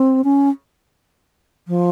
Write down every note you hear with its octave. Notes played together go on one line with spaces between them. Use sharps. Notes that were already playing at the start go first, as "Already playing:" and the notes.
Already playing: C4
C#4
F3